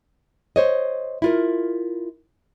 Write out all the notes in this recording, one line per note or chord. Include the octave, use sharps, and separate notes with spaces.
C5 C#5 D#5
E4 F4 A#4